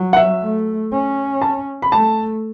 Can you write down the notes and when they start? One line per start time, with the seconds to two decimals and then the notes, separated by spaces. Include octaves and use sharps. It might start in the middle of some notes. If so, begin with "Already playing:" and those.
Already playing: F#3
0.13 F#5
0.17 E5
0.42 A3
0.92 C#4
1.42 A5
1.82 B5
1.92 A3 A5